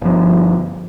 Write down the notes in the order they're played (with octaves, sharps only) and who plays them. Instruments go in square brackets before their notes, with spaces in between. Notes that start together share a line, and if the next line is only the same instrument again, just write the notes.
[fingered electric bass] G1 F3